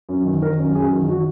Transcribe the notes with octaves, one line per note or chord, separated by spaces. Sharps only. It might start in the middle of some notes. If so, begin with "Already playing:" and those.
F#2
D#3
D#3 A#4
F#2
F#2 G#4
D#3
D#3 F#4